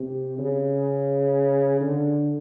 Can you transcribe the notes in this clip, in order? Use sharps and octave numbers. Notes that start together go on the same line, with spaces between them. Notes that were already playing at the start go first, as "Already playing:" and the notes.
Already playing: C3
C#3
D3